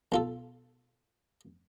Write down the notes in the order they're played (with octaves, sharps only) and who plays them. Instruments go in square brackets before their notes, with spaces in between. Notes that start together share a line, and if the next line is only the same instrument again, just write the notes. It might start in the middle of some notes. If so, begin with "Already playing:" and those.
[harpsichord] B1 F4 A4